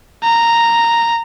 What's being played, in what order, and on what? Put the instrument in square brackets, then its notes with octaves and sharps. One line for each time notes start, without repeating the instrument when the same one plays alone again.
[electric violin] A#5